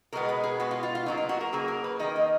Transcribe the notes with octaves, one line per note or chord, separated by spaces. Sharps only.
B2 G#3 B3 A#4
B4
G#4
B2 G#3 B3 F#4
F4
F4
F4
C#3 F#3 A#3 D#4
F4
F#4
A#4
C#3 F#3 A#3 G#4
A#4
B4
D#3 A#3 D#5
D#5